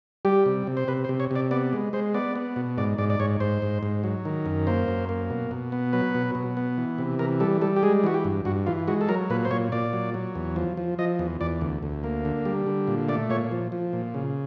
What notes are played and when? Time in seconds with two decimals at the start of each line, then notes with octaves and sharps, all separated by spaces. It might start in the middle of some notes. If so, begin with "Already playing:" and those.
0.25 G3 G4
0.46 C3
0.67 C3
0.77 C5
0.88 C3 B4
1.04 C5
1.09 C3
1.20 C#5
1.31 C3 D5
1.51 B3 D5
1.73 G#3
1.93 G#3 C5
2.14 B3 D5
2.36 B3
2.56 B2
2.78 G#2 D5
2.98 G#2 D5
3.10 D5
3.20 G#2 C#5
3.40 G#2 C5
3.62 G#2
3.83 G#2
4.04 F#3
4.25 D#3
4.46 F#2
4.67 A#3 C5
4.88 F#2
5.09 A#3
5.30 B2
5.51 B2
5.72 B3
5.93 F#3 B4
6.15 B2
6.35 B2
6.57 B3
6.78 E3
6.98 C3
7.19 E3 A#4
7.40 G3 A4
7.61 G3 A4
7.76 G4
7.83 G#3 G#4
8.04 E3 F#4
8.14 G4
8.25 G2
8.45 G2 F#4
8.66 E3 F4
8.87 G#3 F#4
9.01 A4
9.09 F#3 A#4
9.30 A#2 B4
9.45 C5
9.51 A#2 C#5
9.72 A#2 D5
9.93 F#3
10.14 F#3
10.35 E2
10.56 F3
10.77 F3
10.99 F3 D#5
11.19 E2
11.41 E2 D5
11.61 D2
11.83 D2
12.04 A#3
12.25 D3
12.45 G3
12.67 D3
12.88 A#2
13.09 A3 D5
13.30 A#2 C#5
13.51 F3
13.72 F3
13.93 A#2
14.14 C#3